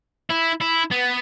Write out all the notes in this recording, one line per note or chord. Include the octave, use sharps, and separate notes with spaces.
E4
E4
B3